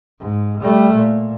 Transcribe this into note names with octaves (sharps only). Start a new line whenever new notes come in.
G#2
G3 A3
A#2